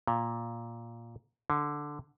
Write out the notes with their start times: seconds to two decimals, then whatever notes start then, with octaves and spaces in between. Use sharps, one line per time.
0.08 A#2
1.50 D3